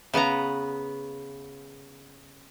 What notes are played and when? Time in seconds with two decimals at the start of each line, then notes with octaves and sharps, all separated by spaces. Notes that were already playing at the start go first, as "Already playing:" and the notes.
0.14 C#3 B3 B4 A#5